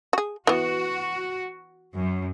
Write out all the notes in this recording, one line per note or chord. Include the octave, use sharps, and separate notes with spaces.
F#4 G#4
E3 B3 F#4
F#2